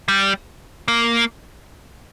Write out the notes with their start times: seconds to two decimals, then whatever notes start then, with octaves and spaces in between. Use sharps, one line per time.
0.08 G3
0.88 A#3